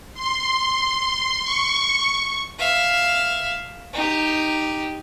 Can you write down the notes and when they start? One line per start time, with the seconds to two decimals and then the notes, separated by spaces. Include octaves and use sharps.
0.14 C6
1.44 C#6
2.59 E5 F5
3.93 D#4 G4